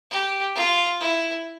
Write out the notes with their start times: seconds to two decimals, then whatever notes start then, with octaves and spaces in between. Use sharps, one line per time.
0.11 G4
0.56 F4
1.01 E4